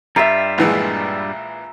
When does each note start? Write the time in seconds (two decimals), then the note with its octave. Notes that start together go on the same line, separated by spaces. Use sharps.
0.16 G2 G3 F4 E5 A#5
0.58 A#1 E3 G#3